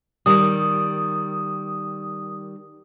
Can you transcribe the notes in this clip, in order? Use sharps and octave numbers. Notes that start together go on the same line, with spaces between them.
D#3 G3 D#6